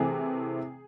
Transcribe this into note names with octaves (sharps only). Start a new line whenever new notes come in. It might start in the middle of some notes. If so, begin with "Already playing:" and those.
Already playing: C3 E3 A3 C4 G#4